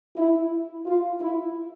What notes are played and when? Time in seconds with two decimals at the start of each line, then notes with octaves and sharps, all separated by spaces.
0.17 E4
0.86 F4
1.21 E4